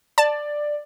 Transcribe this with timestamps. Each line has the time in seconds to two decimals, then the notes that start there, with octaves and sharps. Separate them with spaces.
0.18 D5 A5